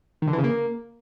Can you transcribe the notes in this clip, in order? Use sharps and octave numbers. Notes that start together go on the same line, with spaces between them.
D#3
D3
E3
C#3
A#3